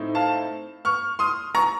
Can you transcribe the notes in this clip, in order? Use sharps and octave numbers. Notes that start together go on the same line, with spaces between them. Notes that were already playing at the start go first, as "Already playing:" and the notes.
Already playing: A2 C4 D#4
F5 A5
C#6 F6
C6 D#6
A#5 C#6